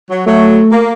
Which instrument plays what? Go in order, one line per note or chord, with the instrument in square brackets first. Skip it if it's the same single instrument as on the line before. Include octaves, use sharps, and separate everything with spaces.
[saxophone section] F#3
[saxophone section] F#3 [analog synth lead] A3
[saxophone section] A#3